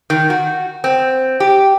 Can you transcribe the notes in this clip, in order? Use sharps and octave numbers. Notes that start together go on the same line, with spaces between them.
D#3
F#4
C4
G4